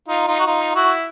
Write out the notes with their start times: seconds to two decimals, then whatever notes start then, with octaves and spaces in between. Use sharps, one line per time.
0.08 D#4 F4
0.27 D#4 F4
0.40 F#4
0.47 D#4 F4
0.75 E4 F#4